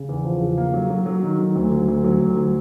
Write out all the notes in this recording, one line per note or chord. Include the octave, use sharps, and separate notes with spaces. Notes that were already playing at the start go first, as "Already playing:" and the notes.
Already playing: C#3
E2
F3
C#3
A#3
F#3
F#3
F#3
D#3
F#3
D2
F#3
D2
F#3
D2
F#3